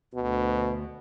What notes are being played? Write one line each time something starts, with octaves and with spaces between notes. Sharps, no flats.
D2 B2